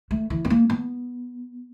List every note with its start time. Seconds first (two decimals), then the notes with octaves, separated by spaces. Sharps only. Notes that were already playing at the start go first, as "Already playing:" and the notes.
0.11 A3
0.30 E3
0.45 B3
0.50 A#3
0.70 B3